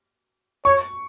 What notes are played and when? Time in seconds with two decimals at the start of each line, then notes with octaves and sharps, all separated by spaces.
0.65 C#5 C#6